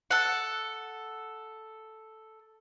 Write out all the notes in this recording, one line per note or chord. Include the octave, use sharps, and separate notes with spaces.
A4 F#5